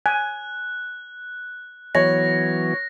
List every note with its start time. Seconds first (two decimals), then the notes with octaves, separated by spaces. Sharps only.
0.06 G#5 F#6
1.95 E3 F#3 B3 C#5 A#6